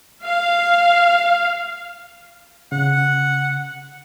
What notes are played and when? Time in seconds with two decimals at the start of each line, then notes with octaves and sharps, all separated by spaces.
0.24 F5
2.72 C#3 F#5